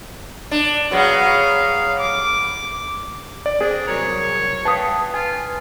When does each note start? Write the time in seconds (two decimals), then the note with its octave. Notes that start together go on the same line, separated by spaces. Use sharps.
0.51 D4
0.91 F#3 B3 G#4 F5
1.99 D6
3.46 D5
3.61 C4 D4 G#4
3.87 C2 F#3 A#4 C#5
4.65 B4 F5 G5 A5 D#6
5.14 F4 G#5